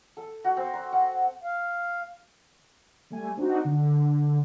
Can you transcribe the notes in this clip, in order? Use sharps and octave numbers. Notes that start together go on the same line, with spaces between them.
A4
F#4
C4
C6
F#5
F5
G3 A3 G#5
C4 D4 D#4 F#4
D3